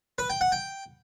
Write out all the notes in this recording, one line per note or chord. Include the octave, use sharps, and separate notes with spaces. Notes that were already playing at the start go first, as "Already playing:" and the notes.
B4
G5
F#5
G5